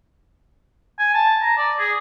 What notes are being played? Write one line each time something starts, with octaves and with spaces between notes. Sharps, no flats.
G#5
A5
A#5
D5
G#4